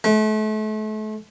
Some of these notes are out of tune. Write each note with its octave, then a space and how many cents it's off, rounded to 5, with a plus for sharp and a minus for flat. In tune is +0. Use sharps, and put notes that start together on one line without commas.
A3 -35